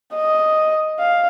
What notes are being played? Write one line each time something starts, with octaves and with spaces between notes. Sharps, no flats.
D#5
F5